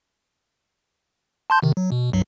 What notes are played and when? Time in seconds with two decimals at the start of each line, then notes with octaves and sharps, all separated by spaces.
1.50 A5 C6 G6
1.62 C3 D#3
1.77 F#3
1.92 B2
2.13 C2 G2 F#3